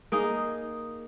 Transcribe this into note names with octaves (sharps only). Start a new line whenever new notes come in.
A#3 D#4 G#4